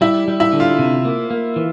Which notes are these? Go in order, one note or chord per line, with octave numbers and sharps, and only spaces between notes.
G3 E4
G3
E4
D3
F4
C3
A#3
A#3
E3